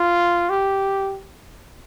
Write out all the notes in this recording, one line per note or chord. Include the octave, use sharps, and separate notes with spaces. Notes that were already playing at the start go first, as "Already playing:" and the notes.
Already playing: F4
G4